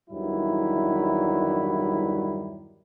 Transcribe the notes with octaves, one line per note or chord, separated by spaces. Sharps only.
E2 G2 D#3 F#3 G3 E4